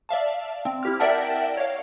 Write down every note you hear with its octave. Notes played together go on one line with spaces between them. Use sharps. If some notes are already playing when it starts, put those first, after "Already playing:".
D5 E5 F5 A5
C4
E4 G4 F6
A#4 D5 E5 F#5 G5 A5
C#5 F5